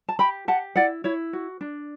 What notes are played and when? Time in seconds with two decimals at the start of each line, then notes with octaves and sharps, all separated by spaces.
0.09 A5
0.19 G4 G5 B5
0.48 G4 F#5 A5
0.76 E4 D5 F#5
1.04 E4 C#5
1.33 F#4
1.61 D4